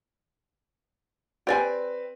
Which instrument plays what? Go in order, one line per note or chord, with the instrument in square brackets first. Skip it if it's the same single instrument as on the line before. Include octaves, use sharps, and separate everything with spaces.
[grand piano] C4 B4 [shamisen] G4 D5 G#5